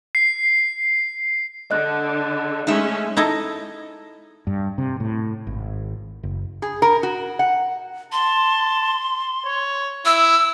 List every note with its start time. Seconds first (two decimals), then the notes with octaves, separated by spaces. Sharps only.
0.15 C7
1.71 D3 D#5 F#6
2.67 G#3 A3 C#4 D#4 E5
3.17 D#4 E4 A4 D#5
4.47 G2
4.78 C3
5.00 A2
5.47 G#1
6.23 F#1
6.62 G#4
6.82 A#4
7.03 F#4
7.39 F#5
8.12 A5 C6
9.45 C#5
10.05 E4 E6